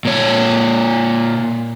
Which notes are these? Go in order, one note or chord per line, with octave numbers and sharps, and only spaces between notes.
A#2 C#5